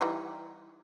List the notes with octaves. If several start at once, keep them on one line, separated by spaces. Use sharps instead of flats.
E3 G3 D#4